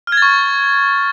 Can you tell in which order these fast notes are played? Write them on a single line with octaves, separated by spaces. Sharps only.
F6 G#6 A6 C#6